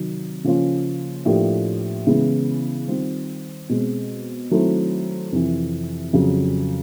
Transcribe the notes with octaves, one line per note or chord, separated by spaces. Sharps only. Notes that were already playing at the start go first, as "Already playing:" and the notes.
Already playing: C3 D#3 F#3
C#3 F3 A#3 C#4 F4
A2 F3 A#3 D4 G4
C#3 E3 G#3 B3 E4
D#3 G3 C4 F4
B2 G#3 C4
D#3 F#3 A3 C4 E4
F2 C3 E3
F2 C#3 F#3